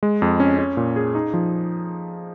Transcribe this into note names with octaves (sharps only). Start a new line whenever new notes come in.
G#3
F2
C#4
C#4
A#2
G#4
D#4
F3